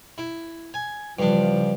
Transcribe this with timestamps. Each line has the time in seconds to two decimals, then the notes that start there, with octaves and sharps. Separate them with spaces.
0.18 E4
0.74 G#5
1.19 G2 C#3 E3 F3 D4